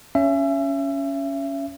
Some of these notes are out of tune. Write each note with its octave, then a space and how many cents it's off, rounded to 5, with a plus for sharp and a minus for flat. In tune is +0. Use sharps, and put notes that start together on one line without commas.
C#4 +10 E5 +30